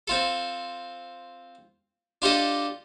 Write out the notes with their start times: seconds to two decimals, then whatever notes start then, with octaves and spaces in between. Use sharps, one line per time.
0.08 C4 F4 A4
2.22 D4 F4 G4 A4 D#5